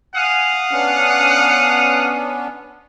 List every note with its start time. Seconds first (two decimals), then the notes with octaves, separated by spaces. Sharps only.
0.14 F5 F#5 G#5 D#6
0.71 B3 C#4 D4